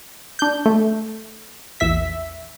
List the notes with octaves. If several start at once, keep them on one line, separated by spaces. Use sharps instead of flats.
D4 G6
A3
A#1 E2 E5 B6